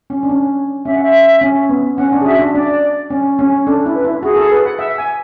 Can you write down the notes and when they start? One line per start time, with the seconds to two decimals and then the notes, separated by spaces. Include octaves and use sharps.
0.10 C#4
0.23 D4
0.29 C#4
0.85 C#4 E5
0.94 F#5
1.03 E5
1.41 C#4
1.69 B3
1.98 C#4 F#5
2.12 D4
2.21 G#4
2.25 F#4 E5
2.39 D4
2.54 D4 D5
3.10 C#4
3.39 C#4
3.66 D4 A4
3.86 E4
3.94 B4
4.05 E4
4.23 F#4 G#4
4.36 A4
4.51 B4
4.65 F#5
4.79 E5
4.98 G#5